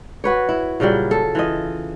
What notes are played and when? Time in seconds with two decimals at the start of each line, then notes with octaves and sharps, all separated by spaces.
0.24 F#4 B4 C#5
0.49 E4
0.80 A#2 C#3 F#3 G3
1.11 A4
1.35 E3 F4 D#5